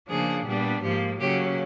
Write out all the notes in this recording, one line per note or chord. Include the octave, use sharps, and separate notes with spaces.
C#3 F3 A#3 D4 G#4
A#2 G3 B3 D4
G#2 F3 A#3 G4
C#3 F#3 A#3 C#4 G4